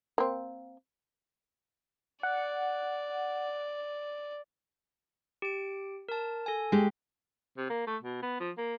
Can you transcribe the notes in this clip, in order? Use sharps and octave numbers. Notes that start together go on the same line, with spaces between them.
A#3 C4
D5 F#5
G4 D7
A#4 A5
A4 G#5
G#3 G4
C3
A#3
A3
B2
B3
F3
A#3